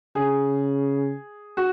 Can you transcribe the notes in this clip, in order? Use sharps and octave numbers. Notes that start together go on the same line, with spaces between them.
C#3 G#4
F#4